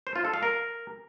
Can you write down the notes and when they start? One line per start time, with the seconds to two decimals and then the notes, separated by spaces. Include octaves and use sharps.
0.07 C5
0.16 F4
0.25 A4
0.34 F5
0.43 A#4